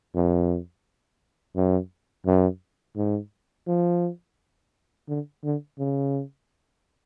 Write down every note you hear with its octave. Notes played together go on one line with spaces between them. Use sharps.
F2
F#2
F#2
G#2
F3
D3
D3
C#3